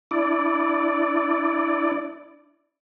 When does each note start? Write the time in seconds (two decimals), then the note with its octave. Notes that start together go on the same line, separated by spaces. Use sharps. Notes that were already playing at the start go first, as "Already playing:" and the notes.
0.11 D4 E4 D5